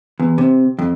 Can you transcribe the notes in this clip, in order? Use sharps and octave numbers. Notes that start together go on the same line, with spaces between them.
E2
C3
F2